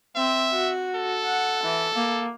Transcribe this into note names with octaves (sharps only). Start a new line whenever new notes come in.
C4 E5
F#4
A4
F#5
E3
A#3